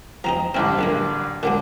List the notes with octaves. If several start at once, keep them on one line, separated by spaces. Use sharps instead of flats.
F3 C4 D#4 A#5
A1 G2 D3 C4 E4
A#1 F#2 A#3
A#2 D3 F#3 A#3